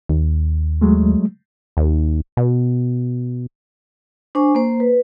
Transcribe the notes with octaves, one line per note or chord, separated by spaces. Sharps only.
D#2
F#3 G#3 A3
D#2
B2
D4 C5 G#5 C#6
A#3 C5
B4